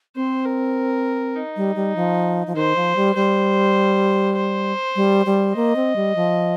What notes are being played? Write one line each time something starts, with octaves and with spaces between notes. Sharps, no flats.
C4 C5
A#4
D#4
G3
G3
F3
F3
D#3 C5
F3
G3
G3 C5
C5
G3
G3
A#3 D#5
C4
G3
F3